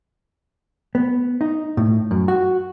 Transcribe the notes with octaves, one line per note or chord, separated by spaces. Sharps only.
B3
D#4
A2
F#2
F#4